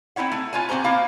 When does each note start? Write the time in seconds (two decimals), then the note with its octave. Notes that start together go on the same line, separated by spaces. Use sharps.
0.16 C4 D#4 E4 C#5 F#5
0.32 A3
0.53 F4 B4 C#5 G#5
0.69 A#2 C4 F#4 C5 A#5
0.84 A#3 E4 F5 A#5